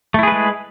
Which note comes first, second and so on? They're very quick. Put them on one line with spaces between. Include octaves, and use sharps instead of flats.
A3 E4 G#4 B4 G#3